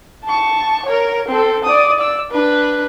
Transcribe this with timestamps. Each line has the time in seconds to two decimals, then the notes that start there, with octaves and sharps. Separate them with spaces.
0.24 A5 C#6
0.85 A#4 C#5
1.27 C4 A4
1.64 D5 D#6
1.99 D5 E6
2.31 D4 B4